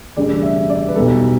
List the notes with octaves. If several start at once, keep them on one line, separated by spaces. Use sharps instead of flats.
E1 D2 C#3 G3 D5
E5
D5
B4
B1 B2 G3 A4